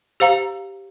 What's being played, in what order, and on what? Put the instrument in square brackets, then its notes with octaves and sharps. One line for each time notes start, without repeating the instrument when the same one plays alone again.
[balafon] G4 C5 F5 A#5